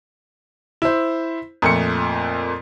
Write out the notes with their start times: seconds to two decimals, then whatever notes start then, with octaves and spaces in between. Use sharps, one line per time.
0.82 E4 C5
1.62 F2 A#2 A3 C#7